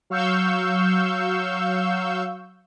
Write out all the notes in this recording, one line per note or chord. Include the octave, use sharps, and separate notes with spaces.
F#3 F5 C#6 E6 G6